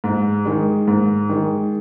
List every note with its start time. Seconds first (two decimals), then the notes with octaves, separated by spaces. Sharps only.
0.04 G#2
0.45 D#3 G#3
0.88 G#2
1.29 D#3 G#3